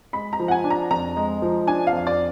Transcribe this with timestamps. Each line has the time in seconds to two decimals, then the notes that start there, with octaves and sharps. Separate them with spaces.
0.13 G#3 B5
0.33 A#5
0.40 F3
0.48 F#5
0.51 G#5
0.64 D4
0.70 A#5
0.91 F2 A#5
1.17 G#3
1.42 F3
1.67 D4 G#5
1.87 F5
1.93 F2
2.07 D5